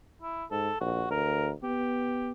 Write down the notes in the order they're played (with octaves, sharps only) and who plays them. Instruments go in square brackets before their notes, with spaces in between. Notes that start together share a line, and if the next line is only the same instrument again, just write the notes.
[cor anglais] E4
[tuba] G#2 [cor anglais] A4
[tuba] A#1 [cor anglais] F#4
[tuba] D2 [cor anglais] A#4
[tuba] B3 [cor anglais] G4